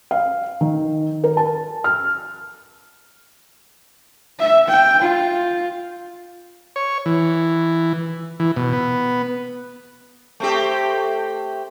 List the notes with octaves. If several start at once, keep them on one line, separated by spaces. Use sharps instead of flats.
F5
D#3
A#4
A5
F6
E5
G5
F4
C#5
E3
E3
B2
B3
A3 C4 G4